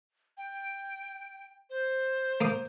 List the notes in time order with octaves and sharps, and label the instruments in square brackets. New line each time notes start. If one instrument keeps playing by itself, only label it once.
[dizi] G5
C5
[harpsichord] A#3 D#6